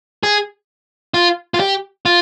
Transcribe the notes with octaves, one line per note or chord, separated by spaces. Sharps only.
G#4
F4
F4
G4
F4